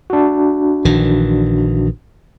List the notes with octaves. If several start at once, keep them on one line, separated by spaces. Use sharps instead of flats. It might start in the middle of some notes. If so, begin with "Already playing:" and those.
D4 F#4
A#1 D#3 E3